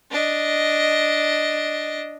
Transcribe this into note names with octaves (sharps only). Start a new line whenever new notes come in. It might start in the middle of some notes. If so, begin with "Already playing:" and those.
D4 D#5